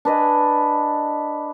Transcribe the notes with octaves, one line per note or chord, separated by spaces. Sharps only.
D4 B4 D#5 G#5